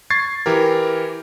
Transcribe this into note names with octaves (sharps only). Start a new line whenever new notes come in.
C#6 G#6 A6 C7
E3 G4 A#4